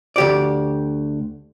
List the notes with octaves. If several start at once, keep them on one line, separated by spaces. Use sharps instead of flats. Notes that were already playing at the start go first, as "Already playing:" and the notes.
D2 G4 D5